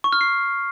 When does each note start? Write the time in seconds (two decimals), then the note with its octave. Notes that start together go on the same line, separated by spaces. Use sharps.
0.04 C#6
0.13 F6
0.21 C7